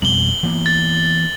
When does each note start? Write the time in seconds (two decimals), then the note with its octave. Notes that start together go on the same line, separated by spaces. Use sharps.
0.02 F2 B2 G3 F#7 G7
0.43 E3 A#3 B3
0.66 A6